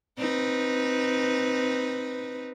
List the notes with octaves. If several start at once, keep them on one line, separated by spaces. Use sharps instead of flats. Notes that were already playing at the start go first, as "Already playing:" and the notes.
C4 D#4 B4